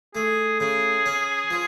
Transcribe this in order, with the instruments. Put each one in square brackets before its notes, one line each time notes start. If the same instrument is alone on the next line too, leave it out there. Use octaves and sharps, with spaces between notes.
[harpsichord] A3 [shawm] G#4
[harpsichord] C#3 [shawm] G#4
[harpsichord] C#4
F3